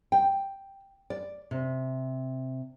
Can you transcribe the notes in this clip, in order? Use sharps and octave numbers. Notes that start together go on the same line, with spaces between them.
G5
D5
C3